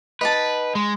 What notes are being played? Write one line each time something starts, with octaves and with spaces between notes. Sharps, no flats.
D#4 B4 G5 A5
G#3